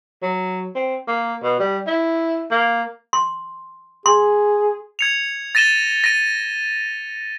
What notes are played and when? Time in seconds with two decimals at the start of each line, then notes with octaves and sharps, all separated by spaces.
0.22 F#3
0.75 C4
1.08 A#3
1.43 B2
1.60 G3
1.87 E4
2.51 A#3
3.13 C6
4.06 G#4 C6
4.99 G#6 C#7 F7
5.55 A6 A#6 D#7 E7 G7
6.04 A#6 D#7